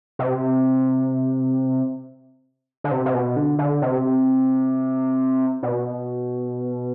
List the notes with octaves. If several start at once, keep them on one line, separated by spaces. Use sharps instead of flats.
C3
D3
C3
C3
B2
D3
D3
C3
B2